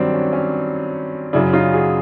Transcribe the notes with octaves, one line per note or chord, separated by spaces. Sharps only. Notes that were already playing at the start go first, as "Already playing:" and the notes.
Already playing: G2 D#3 F#3 C4 D4
C#4
C#4
F#2 C#3 F#3 D4 E4
D#4 F4
F#4 G#4